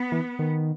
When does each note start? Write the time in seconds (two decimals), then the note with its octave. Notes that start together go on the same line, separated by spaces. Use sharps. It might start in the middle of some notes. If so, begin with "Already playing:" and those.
Already playing: B3
0.12 E3
0.39 D#3